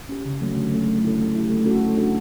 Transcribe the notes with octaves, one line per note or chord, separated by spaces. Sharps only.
C#4 G4
C#3
F#3 A3
D3
A3 C#4
A3
E4 A4
A3
E4 G4
A3
C#4 F#4 A4
A3
D4 F#4 A4